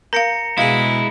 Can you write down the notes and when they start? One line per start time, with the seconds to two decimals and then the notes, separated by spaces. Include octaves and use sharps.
0.13 A#4 F5 A#5 A#6 C#7
0.58 B2 G#3 E4 G#4 F5